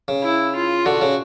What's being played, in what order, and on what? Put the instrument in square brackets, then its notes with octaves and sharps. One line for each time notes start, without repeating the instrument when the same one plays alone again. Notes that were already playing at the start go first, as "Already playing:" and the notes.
[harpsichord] C#3
[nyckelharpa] E4
F4
[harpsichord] D3 [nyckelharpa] F#4
[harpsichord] C#3